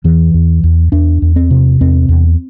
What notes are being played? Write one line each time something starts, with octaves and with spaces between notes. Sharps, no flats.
E2 E3
E2
E2
E2 D4
E2
C4
C3
E2 C4
E2